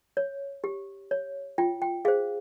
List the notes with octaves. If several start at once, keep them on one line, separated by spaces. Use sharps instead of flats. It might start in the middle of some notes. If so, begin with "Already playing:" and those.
C#5
G4
C#5
F4 G5
G5
G#4 C5 F5